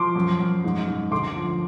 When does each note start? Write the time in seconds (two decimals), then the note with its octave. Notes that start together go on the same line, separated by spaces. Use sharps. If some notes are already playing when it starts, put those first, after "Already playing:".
Already playing: F3 C6 D6
0.15 F#2
0.40 F#2
0.64 G#2
0.88 G#2
1.11 D2 C6 D6
1.36 F3